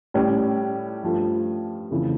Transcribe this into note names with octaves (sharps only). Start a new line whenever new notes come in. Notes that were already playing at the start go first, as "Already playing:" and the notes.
A2 G3 C#4 G4 D5
G2 F3 A3
F2 C#3 E3 A3